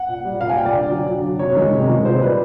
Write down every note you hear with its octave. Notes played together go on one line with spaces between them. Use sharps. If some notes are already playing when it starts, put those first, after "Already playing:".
Already playing: F#5
A#2
G3
A#2 F5
G#5
G3 G5
D5
D3
F#3
D3
F#3
C3 C#5
D#3 G#3
C3
D#3 G#3
A#2 C5
G3 B4